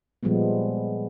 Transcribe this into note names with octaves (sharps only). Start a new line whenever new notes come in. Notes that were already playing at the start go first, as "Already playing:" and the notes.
A#2 F3 G3 G#3 B3